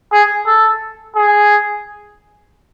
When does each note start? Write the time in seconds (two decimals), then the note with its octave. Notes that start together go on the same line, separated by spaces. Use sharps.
0.13 G#4
0.46 A4
1.16 G#4